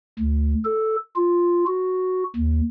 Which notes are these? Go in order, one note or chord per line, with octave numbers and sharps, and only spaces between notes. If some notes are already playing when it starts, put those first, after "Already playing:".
D2
A4
F4
F#4
D#2